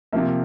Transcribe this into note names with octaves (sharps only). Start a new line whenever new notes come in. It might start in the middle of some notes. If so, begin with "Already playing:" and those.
C3 F3 A#3 E5